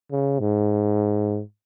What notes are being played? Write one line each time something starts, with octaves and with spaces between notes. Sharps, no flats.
C#3
G#2